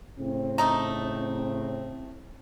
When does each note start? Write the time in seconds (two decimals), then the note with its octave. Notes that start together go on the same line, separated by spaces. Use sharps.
0.19 A2 C#3 C4
0.58 A3 D#4 A#5